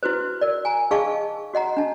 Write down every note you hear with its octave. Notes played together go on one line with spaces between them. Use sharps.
E4 F#4 B4 C5
A#4 D5
G#5 A#5
D#4 G#4 D#5 F5 A5 C#6
F#4 D#5 F#5 A#5
D4 A5